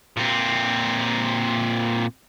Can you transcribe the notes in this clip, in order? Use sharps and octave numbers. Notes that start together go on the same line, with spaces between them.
A#2 C4